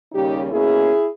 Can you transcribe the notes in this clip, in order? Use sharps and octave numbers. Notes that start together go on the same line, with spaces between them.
D#2 C#3 G3 C#4 D#4 G4
B2 A#3 C#4 E4 G#4